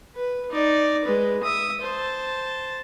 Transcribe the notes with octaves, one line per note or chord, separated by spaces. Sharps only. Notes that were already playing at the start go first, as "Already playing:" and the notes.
B4
D#4 D5
G#3 B4
E5 D#6
C5 A5